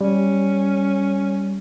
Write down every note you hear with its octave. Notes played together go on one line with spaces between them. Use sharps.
G3 C#4